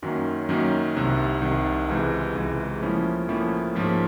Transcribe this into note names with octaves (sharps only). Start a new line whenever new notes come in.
F#2 D#3 F#3 A#3 C#4
F#2 D#3 F#3 A#3 C#4
C2 C3 D#3
C2 C3 D#3
C#2 C3 E3 G#3
C#2 C3 E3 G#3
A2 F3 A#3 C#4 E4
A2 F3 A#3 C#4 E4
G#2 F3 A#3 C#4